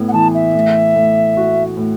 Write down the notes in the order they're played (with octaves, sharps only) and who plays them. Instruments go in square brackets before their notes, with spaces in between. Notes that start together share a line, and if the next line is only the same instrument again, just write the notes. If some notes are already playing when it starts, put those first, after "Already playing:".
Already playing: [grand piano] A2 B3
[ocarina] F#5
[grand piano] E3 [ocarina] A5
[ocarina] E5
[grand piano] A2
A2
F#4
A2